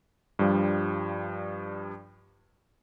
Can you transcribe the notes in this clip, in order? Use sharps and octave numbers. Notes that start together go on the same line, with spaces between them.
G2 F3 G3